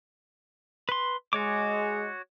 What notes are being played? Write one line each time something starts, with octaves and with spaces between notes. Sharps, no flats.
B4 C6
G#3 F#4 C#5 D6